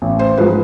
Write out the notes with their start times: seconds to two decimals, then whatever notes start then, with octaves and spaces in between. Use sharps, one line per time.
0.02 A1
0.19 C5
0.37 G#2 F3 G#3 B4